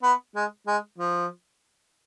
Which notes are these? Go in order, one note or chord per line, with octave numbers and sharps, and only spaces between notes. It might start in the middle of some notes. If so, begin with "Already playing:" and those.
B3
G#3
G#3
F3